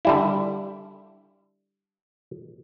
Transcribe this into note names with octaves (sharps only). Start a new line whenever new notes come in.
D3 G3 E4